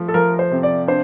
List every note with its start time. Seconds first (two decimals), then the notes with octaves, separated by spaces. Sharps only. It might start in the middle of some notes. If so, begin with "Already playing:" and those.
Already playing: F3 A3
0.08 A4
0.14 F3 A#4
0.39 C5
0.51 C3
0.63 D5
0.88 D4 C5